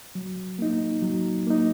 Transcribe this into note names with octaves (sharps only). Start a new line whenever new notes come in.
F#3
A#3 D#4
F#3
A#3 D#4